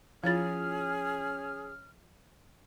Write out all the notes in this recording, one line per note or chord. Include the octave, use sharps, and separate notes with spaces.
F3 C#4 E4 F4 G#4 C#5 F6 A6